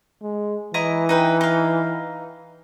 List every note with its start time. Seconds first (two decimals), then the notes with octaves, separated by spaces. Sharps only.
0.22 G#3
0.74 E3 E4 D#5 A#5
1.09 D#4 B4 G5
1.41 D#4 F5